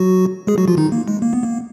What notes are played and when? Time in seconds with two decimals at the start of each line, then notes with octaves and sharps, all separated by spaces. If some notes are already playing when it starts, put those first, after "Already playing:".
Already playing: F#3 F#4
0.47 G#3 G#4
0.58 F#3 F#4
0.68 F3 F4
0.77 D#3 D#4
0.92 A#3
1.08 G#3
1.22 A#3
1.33 B3
1.43 A#3